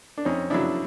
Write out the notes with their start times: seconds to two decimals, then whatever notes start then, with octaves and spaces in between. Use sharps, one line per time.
0.18 D4
0.25 F2 C#4 D#4
0.50 C#3 F#3 D4 E4